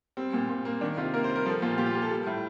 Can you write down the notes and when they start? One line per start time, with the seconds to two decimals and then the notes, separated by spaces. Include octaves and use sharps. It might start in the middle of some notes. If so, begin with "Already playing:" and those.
0.17 G3 C4
0.33 A#2
0.49 A#2
0.65 A#3
0.81 D#3 D4
0.97 C3 F4
1.14 A#3 A#4
1.24 C5
1.30 G3
1.36 A#4
1.46 F3 A4
1.62 A#2 F4
1.78 A#2 G4
1.86 F4
1.94 A#3 G4
2.02 A4
2.10 G3
2.26 A2